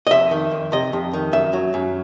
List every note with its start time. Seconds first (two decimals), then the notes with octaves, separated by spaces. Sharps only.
0.07 D#5
0.11 F2 E5
0.31 D#3
0.51 F2
0.72 C3 D#5
0.93 F2
1.13 D#3
1.33 F#2 E5
1.53 F#3
1.74 F#2